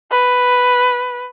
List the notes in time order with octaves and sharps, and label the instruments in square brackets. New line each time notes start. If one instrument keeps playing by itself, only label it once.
[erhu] B4